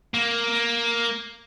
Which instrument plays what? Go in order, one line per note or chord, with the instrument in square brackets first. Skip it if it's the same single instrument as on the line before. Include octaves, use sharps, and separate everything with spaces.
[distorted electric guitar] A#3